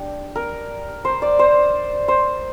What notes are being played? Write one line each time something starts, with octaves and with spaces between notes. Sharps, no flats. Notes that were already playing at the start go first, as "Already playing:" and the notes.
Already playing: D4 G4
A#4
C5
D5
C5
C5